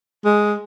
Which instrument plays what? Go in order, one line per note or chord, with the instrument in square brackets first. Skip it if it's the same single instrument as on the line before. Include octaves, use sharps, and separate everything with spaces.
[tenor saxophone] G#3